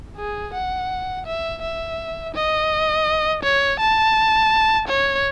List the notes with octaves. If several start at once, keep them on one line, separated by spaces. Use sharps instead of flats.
G#4
F#5
E5
E5
D#5
C#5
A5
C#5